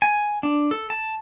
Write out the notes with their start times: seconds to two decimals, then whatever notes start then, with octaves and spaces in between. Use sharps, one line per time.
0.02 G#5
0.43 D4
0.71 A4
0.90 A5